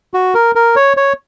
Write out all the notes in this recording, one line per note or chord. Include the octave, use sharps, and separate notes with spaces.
F#4
A#4
A#4
C#5
C#5